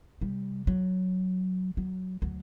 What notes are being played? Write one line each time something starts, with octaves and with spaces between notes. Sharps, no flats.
C3 G3
F#3
F#3
D2 F#3